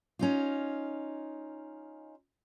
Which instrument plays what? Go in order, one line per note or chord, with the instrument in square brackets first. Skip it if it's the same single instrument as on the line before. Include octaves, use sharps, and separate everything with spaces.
[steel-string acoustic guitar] C#4 D#4 F4